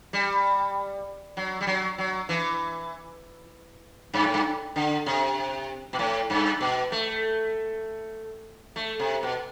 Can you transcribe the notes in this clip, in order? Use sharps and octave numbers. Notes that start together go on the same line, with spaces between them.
G3
F#3
G3
F#3
F#3
E3
G2
A2
G2
D3
C3
B2
A2
G2
B2
A3
A3
C3
B2